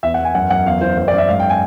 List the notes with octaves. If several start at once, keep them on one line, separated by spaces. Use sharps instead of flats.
E2 E5
F#5
E2
G#5
F#2 F#5
F#2 F#5
E2 F5
E3 C5
F#2 C5
D5
F#2 E5
G#2 F5
G5
G#5